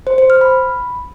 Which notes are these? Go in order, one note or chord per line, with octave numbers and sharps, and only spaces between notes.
C5
C5
F6
B5